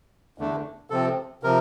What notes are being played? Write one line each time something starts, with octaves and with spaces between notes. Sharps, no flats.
E2 D3 A3 D4
C3 F3 C4 A4
C3 F3 A#4